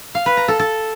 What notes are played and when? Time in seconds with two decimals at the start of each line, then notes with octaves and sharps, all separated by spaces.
0.15 F5
0.26 B4
0.37 A#5
0.48 A4
0.59 A4